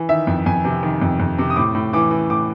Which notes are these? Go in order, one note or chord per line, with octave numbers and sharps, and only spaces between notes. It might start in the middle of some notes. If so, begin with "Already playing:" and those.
Already playing: E3
D#3 E5
F2
F2 G#5
C3
D#3
F2
F2
C3
D#6
A2 D6
A2
E3 D6
E3
A2 D6